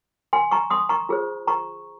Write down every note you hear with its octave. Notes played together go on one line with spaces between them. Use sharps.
G#5 C6
A#5 C#6
C6 D#6
A#5 C#6
F4 G#4 C5
A#5 C#6